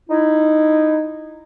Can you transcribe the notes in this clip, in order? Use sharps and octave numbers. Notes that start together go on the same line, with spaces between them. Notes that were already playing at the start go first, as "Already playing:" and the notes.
D#4 E4